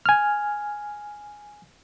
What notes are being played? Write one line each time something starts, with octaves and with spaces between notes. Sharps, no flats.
G#5 F6